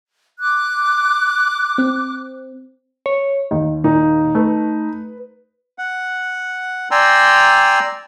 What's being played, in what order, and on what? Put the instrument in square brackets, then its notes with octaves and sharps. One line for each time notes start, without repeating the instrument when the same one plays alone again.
[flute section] D6 F#6
[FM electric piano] C4
[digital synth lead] C#5
[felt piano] D#2 [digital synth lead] D#3
[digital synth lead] A#2 [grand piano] D#4
[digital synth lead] A3 [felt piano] B4
[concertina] F#5
D5 G5 G#5 A#5 C6 E6